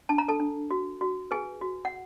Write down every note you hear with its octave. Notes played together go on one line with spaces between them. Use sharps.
D4 A5
A#5
A4 A5
D4
F#4
F#4
G#4 B4 G#5
F#4
F#5